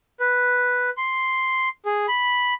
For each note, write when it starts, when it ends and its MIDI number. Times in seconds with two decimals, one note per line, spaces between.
0.20 0.90 71
0.97 1.69 84
1.86 2.06 68
2.08 2.54 83